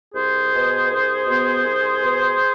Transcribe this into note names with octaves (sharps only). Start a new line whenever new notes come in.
C2 G#4 C5
B2 B3
C2
B2 B3
C2
B2 B3